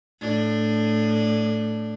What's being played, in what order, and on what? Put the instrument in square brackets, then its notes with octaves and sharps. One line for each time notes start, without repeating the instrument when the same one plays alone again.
[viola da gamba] A2 D4